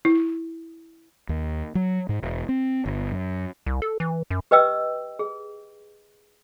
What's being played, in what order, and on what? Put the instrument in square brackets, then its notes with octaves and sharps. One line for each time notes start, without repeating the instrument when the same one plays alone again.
[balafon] E4
[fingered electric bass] D#2
F#3
G#2
E1
C4
G1
F#2
[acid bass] C2
A4
E3
F#2
[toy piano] G4 B4 D#5 G5 E6
G#4